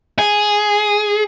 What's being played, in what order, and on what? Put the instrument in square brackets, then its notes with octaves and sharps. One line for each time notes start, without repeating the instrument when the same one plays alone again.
[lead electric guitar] G#4